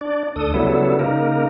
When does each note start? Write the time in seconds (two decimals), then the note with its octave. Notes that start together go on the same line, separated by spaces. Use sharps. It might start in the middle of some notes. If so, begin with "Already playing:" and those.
0.01 D4 D5
0.36 D2 D4 A4 D#6
0.54 C#3 F#3 G3 B3 E4 A4
0.99 C#3 A#3 D#4 A#4